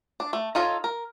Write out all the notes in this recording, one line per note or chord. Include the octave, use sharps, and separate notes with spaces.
D4
A3
D#4 F4 A4 C#5 D#5
A#4